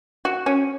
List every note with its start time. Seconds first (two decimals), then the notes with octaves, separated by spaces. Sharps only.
0.25 F#4
0.46 C#4